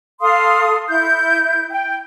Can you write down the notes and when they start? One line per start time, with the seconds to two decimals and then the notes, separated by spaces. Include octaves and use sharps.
0.21 A4 F5 C6 D#6
0.88 E4 G6
1.70 G5